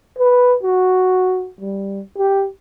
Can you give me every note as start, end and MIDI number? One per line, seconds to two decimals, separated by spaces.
0.18 0.57 71
0.63 1.49 66
1.61 2.01 55
2.18 2.47 67